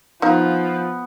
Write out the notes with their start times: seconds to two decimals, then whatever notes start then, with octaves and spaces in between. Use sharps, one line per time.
0.22 F3 B3 D#4 F5